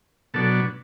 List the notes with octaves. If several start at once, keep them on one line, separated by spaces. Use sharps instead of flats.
B2 F#3 D4 A4